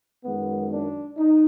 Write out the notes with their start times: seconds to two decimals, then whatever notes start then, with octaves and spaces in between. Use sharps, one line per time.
0.24 F#2 D#3 G#3 B3
0.71 D4
1.18 D#4